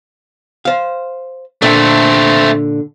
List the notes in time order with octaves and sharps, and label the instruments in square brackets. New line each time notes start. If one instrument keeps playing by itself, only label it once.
[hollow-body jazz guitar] C5 F5
[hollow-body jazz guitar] A#2 D3 E5 [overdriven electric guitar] A3 C4